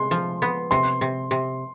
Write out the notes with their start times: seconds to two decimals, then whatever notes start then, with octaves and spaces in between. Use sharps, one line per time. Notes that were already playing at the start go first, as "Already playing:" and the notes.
Already playing: C3 G#3 C6
0.11 F3
0.42 B3
0.71 C3 C6
1.01 C3
1.31 C3